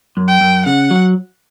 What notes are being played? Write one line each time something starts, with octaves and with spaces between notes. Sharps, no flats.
F#2
G5
F#2
C#3 F#5
F#3